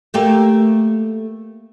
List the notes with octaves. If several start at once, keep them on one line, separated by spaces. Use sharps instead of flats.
A3 A#3 G4